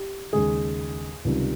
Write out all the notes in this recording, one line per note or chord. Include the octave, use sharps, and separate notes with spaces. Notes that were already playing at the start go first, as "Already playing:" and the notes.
Already playing: G4
D#2 C#3 G#3 G#4
C#2 C3 D#3 G3